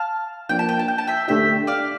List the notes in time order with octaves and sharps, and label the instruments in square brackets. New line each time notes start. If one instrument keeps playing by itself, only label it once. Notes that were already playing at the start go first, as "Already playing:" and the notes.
Already playing: [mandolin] F5 A5
[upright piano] F3 A#3 D4 [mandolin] G5
[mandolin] A5
G5
A5
G5
A5
E5 G5
[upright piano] D3 A3 D4 G4 [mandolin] E5 G5
[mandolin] D5 F5